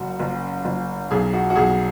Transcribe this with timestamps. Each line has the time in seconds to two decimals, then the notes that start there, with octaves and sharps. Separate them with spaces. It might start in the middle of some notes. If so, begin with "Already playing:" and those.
Already playing: F#1 F#2 F#4
0.20 F#1
0.65 F#1
1.11 B1 G#4
1.33 F#4
1.50 F#4
1.56 B1 G#4